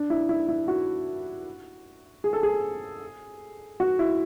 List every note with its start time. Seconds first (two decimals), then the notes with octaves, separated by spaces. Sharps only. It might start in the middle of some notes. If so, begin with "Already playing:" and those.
Already playing: D4
0.10 E4
0.29 E4
0.48 E4
0.68 F#4
2.24 G#4
2.33 A4
2.43 G#4
3.80 F#4
3.99 E4